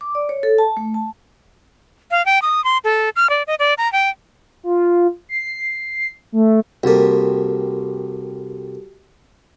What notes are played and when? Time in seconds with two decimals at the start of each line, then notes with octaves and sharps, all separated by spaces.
0.01 D6
0.15 D5
0.29 C#5
0.43 A4
0.58 A5
0.77 A3
0.94 A5
2.11 F5
2.26 G5
2.42 D#6
2.64 C6
2.84 A4
3.16 F6
3.30 D5
3.47 D#5
3.59 D5
3.78 A#5
3.93 G5
4.64 F4
5.29 C7
6.32 A3
6.83 C2 A#3 F#4 G4 A4